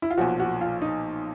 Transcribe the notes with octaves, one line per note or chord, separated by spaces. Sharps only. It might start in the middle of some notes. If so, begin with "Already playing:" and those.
E4
F4
B1 A#2 F3 F#4
F#4
F4
D#4